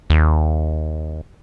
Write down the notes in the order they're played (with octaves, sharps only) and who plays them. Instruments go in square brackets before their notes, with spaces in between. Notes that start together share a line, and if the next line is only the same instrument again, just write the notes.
[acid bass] D#2